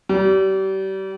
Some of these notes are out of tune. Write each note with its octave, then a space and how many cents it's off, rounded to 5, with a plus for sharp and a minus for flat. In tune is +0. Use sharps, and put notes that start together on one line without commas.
G3 -35